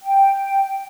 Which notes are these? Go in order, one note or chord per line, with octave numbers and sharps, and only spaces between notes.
G5